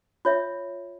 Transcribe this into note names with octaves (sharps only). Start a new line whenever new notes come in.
F4 C#5 E5